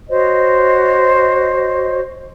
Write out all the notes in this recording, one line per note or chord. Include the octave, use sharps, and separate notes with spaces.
F#4 C5 C#5 D#5